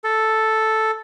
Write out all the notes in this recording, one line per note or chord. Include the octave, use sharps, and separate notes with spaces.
A4